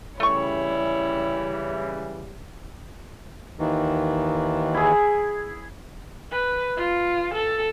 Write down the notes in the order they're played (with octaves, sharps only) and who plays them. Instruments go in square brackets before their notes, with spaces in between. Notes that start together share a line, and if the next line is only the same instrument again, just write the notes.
[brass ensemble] C#3 E3 G3 [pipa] A3 C#6 [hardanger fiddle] E4 C#5
[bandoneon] D#2 D#3 E3
[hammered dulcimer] E4 G#4
[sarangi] B4
F4
A4